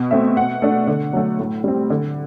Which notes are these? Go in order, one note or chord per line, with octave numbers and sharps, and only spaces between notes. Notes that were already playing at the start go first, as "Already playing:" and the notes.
Already playing: B2
A3 C4 E5
B2 F#5
A3 D4
D3
F#3 A3
A2
G3 C4
D3